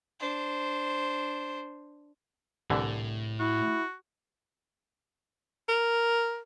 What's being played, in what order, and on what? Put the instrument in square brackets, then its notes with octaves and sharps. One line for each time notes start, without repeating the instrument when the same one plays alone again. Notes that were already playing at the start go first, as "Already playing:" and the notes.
[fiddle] D4 C5
[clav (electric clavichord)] C2 D3 E3 [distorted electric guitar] A2
[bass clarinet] E4 [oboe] F#4
[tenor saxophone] A#4